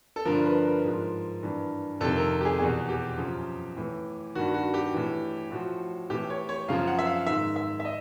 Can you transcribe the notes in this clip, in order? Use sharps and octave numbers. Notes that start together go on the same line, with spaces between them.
A4
G2 D3 F3 A#4
B4
A#4
G#2 F3
G2 E3
F2 C3 D#3 A4
A#4
G4
G#4
E2 B2 G#4
G4
F#2 C#3 F3
A2 E3
G2 D#3 F#4
F#4
G4
A2 E3
A2 F3 F#4
A2 E3 G4
C#5
C#5
F#2 C#3 F3 F5
F#5
E5
F5
G#2 D#3 E5
E5
E5
D#5